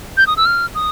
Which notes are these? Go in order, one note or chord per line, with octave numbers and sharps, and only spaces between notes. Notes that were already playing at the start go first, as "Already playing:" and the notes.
G6
D#6
E6
F6
D#6